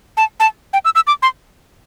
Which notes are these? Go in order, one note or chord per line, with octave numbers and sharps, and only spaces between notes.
A5
A5
G5
E6
E6
D6
C6